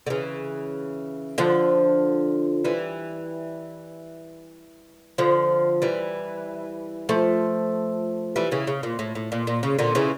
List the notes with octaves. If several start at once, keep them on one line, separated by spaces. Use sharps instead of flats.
D3
C#3 E3
D3 F3
E3 G3
D3 F3
E3 G3
F3 A3
E3 G3
C#3 E3
C#3
A#2
A2
A2
A#2
A#2
C#3
A#2 D3
C#3 E3